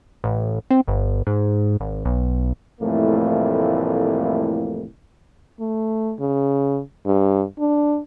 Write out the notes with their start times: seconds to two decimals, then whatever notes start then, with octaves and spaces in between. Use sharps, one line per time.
0.24 A1
0.71 C4
0.88 G1
1.27 G#2
1.80 G#1
2.05 B1
2.81 C2 F2 A2 E3 A3 A#3
5.60 A3
6.20 C#3
7.06 G2
7.59 D4